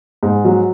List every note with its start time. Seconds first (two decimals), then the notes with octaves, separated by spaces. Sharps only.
0.23 G#2
0.45 F#3